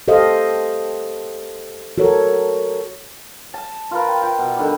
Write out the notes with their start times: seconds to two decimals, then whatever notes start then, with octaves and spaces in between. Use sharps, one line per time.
0.08 G4 A4 C5 D#5 F5
1.98 F#4 A4 A#4 C#5
3.54 A5
3.91 F4 A#4 B4
4.08 G5
4.22 F4 G5
4.38 B2 F#5
4.56 D3 D#3 G3 G4